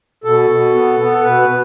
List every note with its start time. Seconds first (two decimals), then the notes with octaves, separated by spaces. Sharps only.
0.24 B2 A4
0.50 B2
0.74 B3
1.00 B3
1.24 B2 B4
1.41 B4
1.48 B2